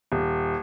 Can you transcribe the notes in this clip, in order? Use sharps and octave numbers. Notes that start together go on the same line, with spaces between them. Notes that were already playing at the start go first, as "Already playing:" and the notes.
D#1